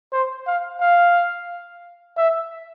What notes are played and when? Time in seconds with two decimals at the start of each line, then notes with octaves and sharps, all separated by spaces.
0.13 C5
0.47 F5
0.81 F5
2.17 E5